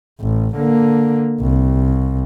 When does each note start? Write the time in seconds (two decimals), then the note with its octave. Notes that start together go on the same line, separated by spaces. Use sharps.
0.20 A1
0.57 D3 A#3
1.41 C2